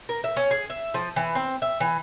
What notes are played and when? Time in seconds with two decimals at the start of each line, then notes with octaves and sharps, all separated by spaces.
0.09 A#4
0.24 E5
0.37 C#4
0.51 G#4
0.70 E5
0.94 F3
1.16 E3
1.35 C4
1.62 E5
1.80 E3